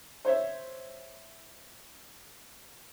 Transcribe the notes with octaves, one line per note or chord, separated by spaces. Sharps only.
C5 C#5 E5